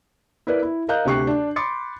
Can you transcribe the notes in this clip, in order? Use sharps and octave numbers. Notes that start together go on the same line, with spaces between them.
E4 A#4 B4 D5
E4
A#4 D#5 F5 A#5 F#6 G6
D2 C3 G4 C#6 F#6 C7
D4
B5 C6 D6 A6 C#7